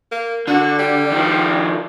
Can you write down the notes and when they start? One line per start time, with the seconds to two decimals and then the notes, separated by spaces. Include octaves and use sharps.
0.12 A#3
0.48 D3 F#4
0.79 G3
1.12 D#3 F3